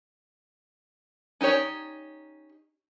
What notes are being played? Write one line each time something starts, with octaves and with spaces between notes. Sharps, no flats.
C#4 D#4 G4 C#5 D5